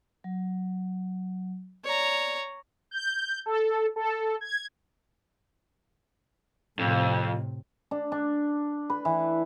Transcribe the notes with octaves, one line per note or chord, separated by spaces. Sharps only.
F#3
C#5 D5 A#5
G6
A4
A4
G#6
F2 A2 C3
D4
D4
B4
E3